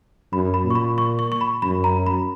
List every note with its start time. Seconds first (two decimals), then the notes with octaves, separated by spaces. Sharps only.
0.33 F#2 B5
0.54 B5
0.65 A#2
0.70 C#6
0.75 B5
0.98 C#6
1.19 C#6
1.32 C#6
1.41 B5
1.62 F#2 B5
1.84 A#5
2.07 B5